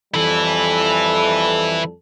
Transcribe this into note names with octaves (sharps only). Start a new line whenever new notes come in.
F2 E3 G3 E4 A4